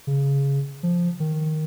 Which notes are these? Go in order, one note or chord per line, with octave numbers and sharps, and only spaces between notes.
C#3
F3
D#3